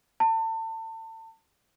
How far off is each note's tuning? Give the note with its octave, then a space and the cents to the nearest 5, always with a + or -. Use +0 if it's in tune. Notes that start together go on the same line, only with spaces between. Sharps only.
A5 +35